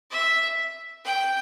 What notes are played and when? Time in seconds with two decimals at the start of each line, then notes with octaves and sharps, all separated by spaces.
0.11 E5
1.05 G5